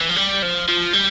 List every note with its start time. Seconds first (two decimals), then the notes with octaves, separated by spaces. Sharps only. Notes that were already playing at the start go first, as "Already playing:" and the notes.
0.01 E3
0.09 F3
0.16 G3
0.42 F3
0.69 F3
0.94 G3